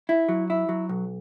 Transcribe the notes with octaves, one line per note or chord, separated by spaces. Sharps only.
E4
F#3
E4
F#3
B1